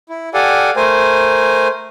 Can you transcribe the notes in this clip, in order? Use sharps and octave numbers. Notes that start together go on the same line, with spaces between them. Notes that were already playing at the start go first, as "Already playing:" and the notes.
E4
G4 A4 D5 F5 F#5 G#5
A3 A#4 C5 G#5